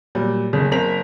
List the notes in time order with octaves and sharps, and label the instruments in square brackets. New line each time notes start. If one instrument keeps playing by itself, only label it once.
[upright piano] A#2 F#3 G3
F#1 C#3
F#1 C4 A#4 B6 F7